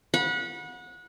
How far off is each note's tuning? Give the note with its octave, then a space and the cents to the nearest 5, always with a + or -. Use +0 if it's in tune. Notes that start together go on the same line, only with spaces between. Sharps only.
F#5 -25 B5 -30